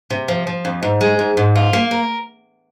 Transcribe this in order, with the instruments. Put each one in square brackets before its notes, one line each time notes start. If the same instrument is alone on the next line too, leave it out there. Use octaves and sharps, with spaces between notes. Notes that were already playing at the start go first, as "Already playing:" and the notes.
[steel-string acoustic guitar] C3
F3
F3
F2
G#2
G#3
G#2
G#2
F4
A#3
A#4